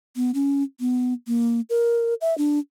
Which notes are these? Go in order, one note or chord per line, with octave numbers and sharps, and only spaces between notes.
B3
C#4
B3
A#3
A#4
E5
D4